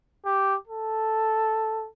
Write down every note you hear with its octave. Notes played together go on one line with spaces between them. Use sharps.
G4
A4